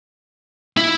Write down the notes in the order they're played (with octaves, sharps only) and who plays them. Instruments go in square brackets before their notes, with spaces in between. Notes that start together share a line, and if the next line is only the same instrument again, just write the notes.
[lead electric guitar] E4